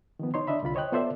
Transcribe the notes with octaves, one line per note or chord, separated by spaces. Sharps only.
D#3 F3 B3
D#4 C#5 C6
D4 D#5 E5 B5
C2 D3 F4 B5
C5 C#5 D#5 G5 F#6
B3 F4 A4 C5 D5 E5